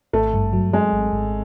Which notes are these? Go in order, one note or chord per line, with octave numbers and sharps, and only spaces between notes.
G#1 A3
G2
F#3
F#3 G#3
G#1
G#1